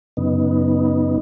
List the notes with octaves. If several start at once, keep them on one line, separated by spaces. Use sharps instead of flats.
F#2 C#3 B3 D#4